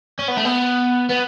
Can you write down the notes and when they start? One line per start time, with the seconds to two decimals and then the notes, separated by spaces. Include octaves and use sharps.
0.19 C#4
0.28 B3
0.37 A3
0.45 B3
1.09 B3